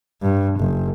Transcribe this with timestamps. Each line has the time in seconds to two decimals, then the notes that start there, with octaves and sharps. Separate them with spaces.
0.22 G2
0.59 F#1